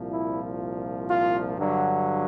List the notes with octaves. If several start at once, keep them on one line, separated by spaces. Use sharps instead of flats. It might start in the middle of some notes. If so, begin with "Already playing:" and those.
Already playing: C2 A#2 F3
E4
F4
G2 D3 F#3